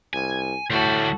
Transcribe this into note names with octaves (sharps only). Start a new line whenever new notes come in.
C2 G#5
D2 A2 G3 F#4 A4